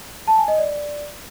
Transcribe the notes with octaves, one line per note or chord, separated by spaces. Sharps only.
A5
G#5
D#5
D5